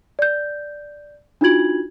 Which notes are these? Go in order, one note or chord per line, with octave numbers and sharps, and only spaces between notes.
D5 G6
D4 D#4 F4 F#4 G#6 F#7